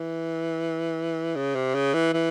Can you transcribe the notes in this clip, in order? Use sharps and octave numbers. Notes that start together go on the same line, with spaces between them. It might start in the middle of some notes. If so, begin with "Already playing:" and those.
Already playing: E3
C#3
C3
C#3
E3
E3